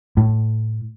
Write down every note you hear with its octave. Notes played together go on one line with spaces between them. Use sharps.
A2